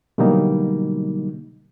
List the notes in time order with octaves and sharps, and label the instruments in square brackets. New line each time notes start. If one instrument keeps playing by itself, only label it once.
[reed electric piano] B2 D3 F#3 G3 A#3 D#4